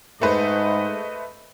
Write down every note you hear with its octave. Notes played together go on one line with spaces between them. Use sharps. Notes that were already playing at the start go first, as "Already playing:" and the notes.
G#2 A3 B4 C5 D#5